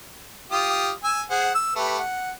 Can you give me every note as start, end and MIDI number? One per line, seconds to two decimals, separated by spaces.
0.51 0.91 65
0.51 0.91 67
0.51 0.91 87
1.04 1.22 80
1.04 1.22 88
1.31 1.51 68
1.31 1.51 72
1.31 1.51 78
1.55 1.71 88
1.76 1.99 57
1.76 1.99 67
1.76 1.99 71
1.99 2.31 78